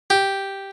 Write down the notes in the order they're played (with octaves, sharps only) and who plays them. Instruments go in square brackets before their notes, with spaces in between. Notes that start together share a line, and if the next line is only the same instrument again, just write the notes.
[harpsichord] G4